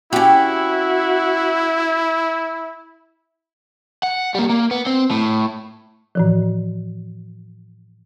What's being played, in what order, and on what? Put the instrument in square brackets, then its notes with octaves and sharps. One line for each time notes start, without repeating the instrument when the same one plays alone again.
[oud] C#4 G4 [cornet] E4 [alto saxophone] F#4
[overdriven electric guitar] F#5
G3 A#3
A#3
B3
C4
A2
[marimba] A2 E3 F3